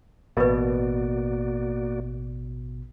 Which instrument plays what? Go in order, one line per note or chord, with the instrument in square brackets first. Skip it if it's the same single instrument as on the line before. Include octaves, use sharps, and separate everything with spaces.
[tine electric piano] A1 B2 [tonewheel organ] A#3 F#4 D5 [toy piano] A#4 B4